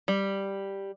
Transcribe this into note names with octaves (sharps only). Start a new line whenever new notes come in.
G3